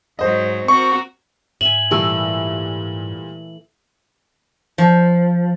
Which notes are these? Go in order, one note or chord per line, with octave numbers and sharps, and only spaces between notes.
G#2 F#3 C5 D#5
C4 F#4 A#4 C#6
G#2 E5 G#5 F#7
A#2 E3 G3 A3 E6
F3